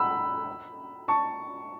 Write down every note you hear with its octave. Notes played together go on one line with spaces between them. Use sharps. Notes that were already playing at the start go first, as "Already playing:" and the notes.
Already playing: F#5 B5 E6
A5 C#6